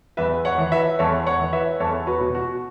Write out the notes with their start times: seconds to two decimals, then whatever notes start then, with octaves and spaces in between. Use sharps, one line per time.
0.17 E2 B4 E5
0.45 C#5 F#5
0.58 E3
0.72 B4 E5
0.99 E2 A4 C#5
1.27 C#5 F#5
1.40 E3
1.53 B4 E5
1.80 E2 A4 C#5
2.07 F#4 B4
2.21 B2
2.35 F#4